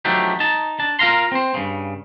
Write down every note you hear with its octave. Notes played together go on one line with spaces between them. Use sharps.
F3 F#3 A3 D4 D#4 G4
D#4 A5
D4 A5
F4 A#4 F5 A#5 C6
C4 C5
G2 C#3